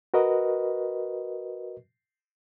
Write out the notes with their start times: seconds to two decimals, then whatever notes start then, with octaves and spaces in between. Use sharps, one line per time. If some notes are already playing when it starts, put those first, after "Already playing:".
0.14 F#4 A#4 B4 D#5